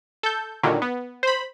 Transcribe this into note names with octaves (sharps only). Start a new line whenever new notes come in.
A4 G6
A#2 D3 D#3 F#3 G3
B3
C5 B5